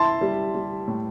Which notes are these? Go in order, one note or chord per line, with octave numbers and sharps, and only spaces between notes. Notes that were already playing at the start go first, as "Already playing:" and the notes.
Already playing: E4 A5 C6
G3
G3
A2